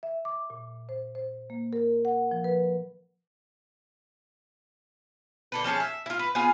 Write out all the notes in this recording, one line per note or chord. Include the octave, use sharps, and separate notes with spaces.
E5
D6
A#2
C5
C5
A#3
A#4
F#5
F3
B4
D3 A4 B4
F3 C#4 G#4 A4
E5
E4 F4
B4
B3 F4 G#4 G#5